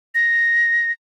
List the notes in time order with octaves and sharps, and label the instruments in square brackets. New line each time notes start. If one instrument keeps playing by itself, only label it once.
[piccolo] A#6